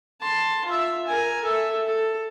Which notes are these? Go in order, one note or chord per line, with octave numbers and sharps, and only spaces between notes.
A5 C6
F4 E5
A#4 G#5
A4 E5
A4